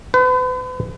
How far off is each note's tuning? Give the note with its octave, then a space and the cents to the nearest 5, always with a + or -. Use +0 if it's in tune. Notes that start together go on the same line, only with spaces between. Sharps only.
B4 +40